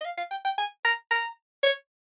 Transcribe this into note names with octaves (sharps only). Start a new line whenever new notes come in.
D#5
F5
F5
G5
G5
G#5
A#5
A#5
C#5